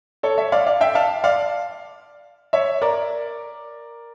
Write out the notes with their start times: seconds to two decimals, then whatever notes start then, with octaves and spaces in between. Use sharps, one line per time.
0.23 A4 C#5
0.38 C#5 E5
0.52 D5 F5
0.66 D5 F5
0.81 E5 G5
0.95 F5 A5
1.24 D5 F5
2.53 C#5 E5
2.82 A#4 D5